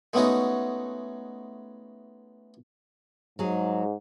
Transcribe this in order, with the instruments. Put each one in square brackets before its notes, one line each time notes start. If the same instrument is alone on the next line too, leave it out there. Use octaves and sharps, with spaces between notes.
[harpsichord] G#3 A3 B3 C#4 D#4 F#4
[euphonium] G#2 [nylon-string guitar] F#3 G#4